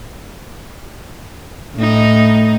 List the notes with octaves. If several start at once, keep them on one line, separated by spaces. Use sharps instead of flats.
A2 D#4